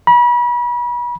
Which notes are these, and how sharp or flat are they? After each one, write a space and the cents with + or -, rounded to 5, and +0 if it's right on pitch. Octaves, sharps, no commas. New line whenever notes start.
B5 -35